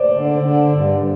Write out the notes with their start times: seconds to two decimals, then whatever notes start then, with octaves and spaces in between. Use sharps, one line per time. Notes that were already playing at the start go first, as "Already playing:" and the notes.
Already playing: C5 D5
0.14 D3
0.43 D3
0.72 G2